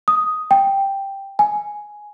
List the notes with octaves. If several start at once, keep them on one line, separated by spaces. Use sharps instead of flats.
D#6
G5
G#5